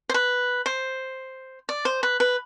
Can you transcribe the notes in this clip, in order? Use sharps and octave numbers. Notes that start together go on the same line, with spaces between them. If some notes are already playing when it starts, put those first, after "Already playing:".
C5
B4
C5
D5
C5
B4
B4